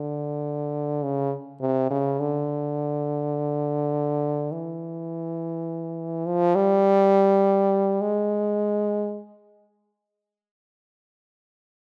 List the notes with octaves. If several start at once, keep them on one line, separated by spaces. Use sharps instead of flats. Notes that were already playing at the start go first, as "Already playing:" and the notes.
Already playing: D3
C#3
C3
C#3
D3
E3
F3
G3
G#3